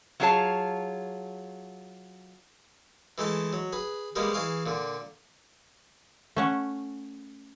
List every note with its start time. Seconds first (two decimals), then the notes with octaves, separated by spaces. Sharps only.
0.20 F#3 E4 F4 G#4 C#5 A5
3.18 E3 G#3 A3 A5
3.53 F#3
3.73 G#4 B4
4.16 G3 G#3 A#3 B3 G#4
4.33 E3 G#4 F5 C#6
4.66 A#2 D3
6.36 A3 C#4 F#5